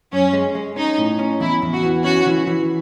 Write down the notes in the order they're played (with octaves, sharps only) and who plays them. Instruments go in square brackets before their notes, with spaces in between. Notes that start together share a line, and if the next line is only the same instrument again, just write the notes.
[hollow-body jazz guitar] F#2 [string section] C#4
[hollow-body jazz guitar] G#3
G#3
[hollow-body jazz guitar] C#4 [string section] D#4
[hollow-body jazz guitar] A2
C#4
[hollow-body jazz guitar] E2 [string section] E4
[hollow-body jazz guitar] E2
[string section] F#4
[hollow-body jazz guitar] E3
[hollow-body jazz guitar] C#4 [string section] F#4
[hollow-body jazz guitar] E3
E3